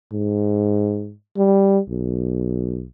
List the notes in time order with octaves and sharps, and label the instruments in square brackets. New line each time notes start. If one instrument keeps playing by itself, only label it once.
[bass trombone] G#2
G3
B1